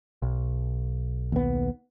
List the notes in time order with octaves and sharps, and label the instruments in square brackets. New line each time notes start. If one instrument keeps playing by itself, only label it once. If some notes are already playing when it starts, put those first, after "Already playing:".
[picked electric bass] B1
[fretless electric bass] D#2 B3